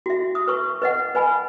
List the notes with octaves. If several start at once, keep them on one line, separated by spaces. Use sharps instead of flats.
F#4 E5
D#6
B4 C#6
B4 D#5 F#5
B4 D#5 G#5 B5